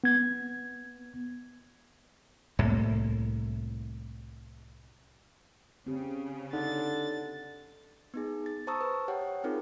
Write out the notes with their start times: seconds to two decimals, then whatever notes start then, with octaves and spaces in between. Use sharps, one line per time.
0.04 B3 G#6
2.59 C2 A2 A#3
5.87 C#3 C4 G4
6.53 D3 D#4 A6
8.14 B3 D#4 G#4
8.46 A6
8.67 C5 A5 A#5 C#6 D#6 E6
8.81 B4
9.08 G4 C#5 F#5 G5
9.44 C4 D#4 F4 G#4 A#4